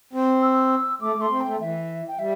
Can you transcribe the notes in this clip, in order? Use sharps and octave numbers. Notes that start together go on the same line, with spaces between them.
C4
E6
A3 D6
A3
C6
C4
A3 G5
E3 E5
G5
G3 E5